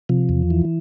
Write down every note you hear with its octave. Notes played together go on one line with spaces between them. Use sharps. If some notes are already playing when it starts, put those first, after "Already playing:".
C3 F3
E2
E3